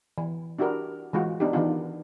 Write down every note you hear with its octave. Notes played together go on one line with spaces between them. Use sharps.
E3
D4 E4 F#4 G4 A#4
E3 G#3 F4 F#4
B3 D4 D#4 G4
D#3 E3 B3 D4 D#4 F4